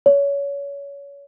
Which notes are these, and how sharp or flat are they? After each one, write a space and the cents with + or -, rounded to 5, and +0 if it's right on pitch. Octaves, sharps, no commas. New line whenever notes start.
C#5 +25